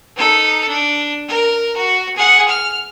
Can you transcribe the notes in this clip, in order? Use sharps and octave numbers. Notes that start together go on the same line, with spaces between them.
D#4 A4
D4
A#4
F#4
G#4 F#5
F6